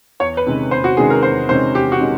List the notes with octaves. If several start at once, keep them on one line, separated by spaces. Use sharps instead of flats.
E2 C#5
B4
C3 D#3 G#3 C#4
E2 C5
F#4
C3 D#3 G#3 C#4 G#4
A#4
E2 C5
C3 D#3 G#3 C#4 C5
E2 G4
F#4
C3 D#3 G#3 C#4